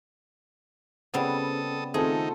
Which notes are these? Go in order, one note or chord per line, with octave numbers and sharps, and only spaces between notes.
C#3 G3 B3 C4 F#4 A4 D#6
D#3 A3 C4 D#4 F4 G#4 A4